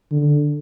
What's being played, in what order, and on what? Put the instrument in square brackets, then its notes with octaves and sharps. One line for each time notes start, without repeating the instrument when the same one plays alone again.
[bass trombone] D3